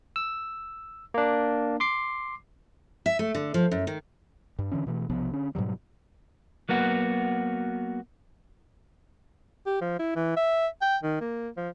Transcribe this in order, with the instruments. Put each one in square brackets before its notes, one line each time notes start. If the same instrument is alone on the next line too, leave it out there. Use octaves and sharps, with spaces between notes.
[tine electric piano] E6
A#3 D4
C6 D6 C7
[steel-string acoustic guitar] E5
A3
D3
F3
F#2
D#3
[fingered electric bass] G2
D3 E3 C#4
B2 E3 A3
B1 C3 F3 B3
D3 C#4
G#2 B2 F#3 G3
[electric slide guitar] F#3 A#3 B3 F#4
[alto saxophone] G4
F3
E4
E3
E5
G5
D#3
A#3
F3